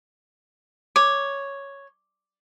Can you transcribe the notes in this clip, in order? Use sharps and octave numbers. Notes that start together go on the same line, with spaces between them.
C#5 D6